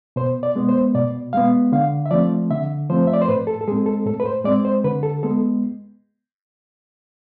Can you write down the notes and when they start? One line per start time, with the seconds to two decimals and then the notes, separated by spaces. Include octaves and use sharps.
0.16 B2 C5
0.43 D5
0.56 G#3 B3
0.69 C5
0.95 B2 D5
1.33 G#3 B3 F5
1.72 D3 F5
2.06 E5
2.11 F3 A3 C4 D5
2.51 D3 E5
2.90 F3 A3 C4 C5
3.07 E5
3.13 D5
3.22 C5
3.28 A2 B4
3.47 A4
3.61 A4
3.67 G#3 G#4
3.72 C4
3.86 A4
4.06 A2 A4
4.20 B4
4.26 C5
4.44 G#3 C4 D5
4.65 C5
4.84 D3 B4
5.03 A4
5.23 G#3 B3 A4